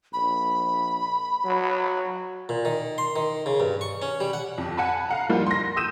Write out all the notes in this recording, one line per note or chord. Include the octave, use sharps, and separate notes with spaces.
A#1 B5
F#3
A#2
D#3
C6
D#3
C#3
G2
C#6
C#4
G3
F#5
F2
F#5 G#5 A5 B5
F5 F#5 A#5
F3 G3 A#3 D#4 F4
C6 A#6
D#6 E6 G6 D#7 E7